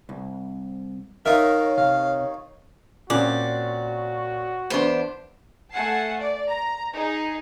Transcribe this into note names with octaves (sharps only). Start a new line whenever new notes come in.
C2
D#3 D#4 F4 A#4 C#5 E5
C3 F5
A#2 C4 C#4 F#4 D5 F#6
E2 B3 D4 C5
A3 F#5 G#5 A5 C7
D5
A#5
D#4 G#4